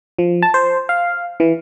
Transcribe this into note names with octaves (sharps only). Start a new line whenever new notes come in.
F3
A5
C5
F5
E3